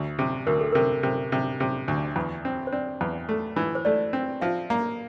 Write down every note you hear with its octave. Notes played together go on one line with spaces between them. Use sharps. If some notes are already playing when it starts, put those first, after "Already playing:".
Already playing: D2
C3
D2 A#4
A4
C3 A#4
C3
C3
C3
D2
E2
C4
C5
C4 D5
E2
A3
E3
C5
A3 D5
C4
F3 E5
A#3